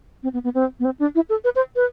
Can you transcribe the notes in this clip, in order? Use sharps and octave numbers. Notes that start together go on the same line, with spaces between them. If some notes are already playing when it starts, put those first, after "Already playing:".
C4
B3
B3
C4
B3
C4
D4
E4
A4
B4
C5
B4